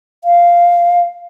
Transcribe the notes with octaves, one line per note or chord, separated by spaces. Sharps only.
F5